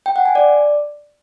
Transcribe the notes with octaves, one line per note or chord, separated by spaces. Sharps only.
G5
F#5
G#5
D5